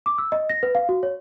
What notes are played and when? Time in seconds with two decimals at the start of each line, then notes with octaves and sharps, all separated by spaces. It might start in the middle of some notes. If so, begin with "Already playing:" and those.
0.06 D6
0.18 E6
0.32 D#5
0.50 A#6
0.63 B4
0.75 F5
0.89 F#4
1.03 C#5